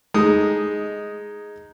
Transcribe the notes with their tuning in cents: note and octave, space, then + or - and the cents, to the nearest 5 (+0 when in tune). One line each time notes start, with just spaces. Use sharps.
G#3 +0 D#4 +0 D#6 +0